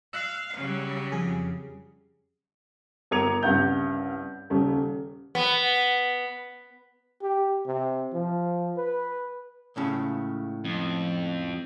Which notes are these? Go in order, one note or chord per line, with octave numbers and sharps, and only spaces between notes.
F5 E6 F#6
C#3 F#3 G3
F2 G#4
G1 A#4 D6 G#6 C#7 F7
C2 G2 C#3 F#5 G6
D#1 C#3 G3
B3
G4
C3
F3
B4
C#2 A2 C#3
F2